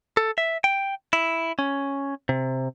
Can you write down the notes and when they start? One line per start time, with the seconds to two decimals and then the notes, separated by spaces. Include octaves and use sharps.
0.17 A4
0.38 E5
0.64 G5
1.13 E4
1.59 C#4
2.29 C3